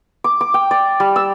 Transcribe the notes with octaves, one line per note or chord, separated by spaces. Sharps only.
D6
D6
G5
D5
G3
E6